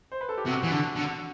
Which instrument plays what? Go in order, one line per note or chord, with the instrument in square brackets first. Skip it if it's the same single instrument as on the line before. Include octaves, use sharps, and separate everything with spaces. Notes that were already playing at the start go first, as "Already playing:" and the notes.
[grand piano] C5
B4
A4
G4
[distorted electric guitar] C3 [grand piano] F#4
[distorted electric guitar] E3
D3
D3